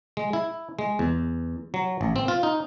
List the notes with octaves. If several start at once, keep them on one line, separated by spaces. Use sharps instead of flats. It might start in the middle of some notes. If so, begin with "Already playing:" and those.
G#3
E4
G#3
E2
F#3
A1
C4
F4
D#4